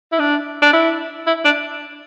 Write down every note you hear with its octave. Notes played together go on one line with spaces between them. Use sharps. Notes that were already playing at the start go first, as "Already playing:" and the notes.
E4
D4
D4
E4
E4
D4